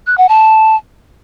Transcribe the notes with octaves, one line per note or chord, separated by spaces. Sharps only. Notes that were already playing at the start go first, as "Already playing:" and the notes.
F#6
F#5
A5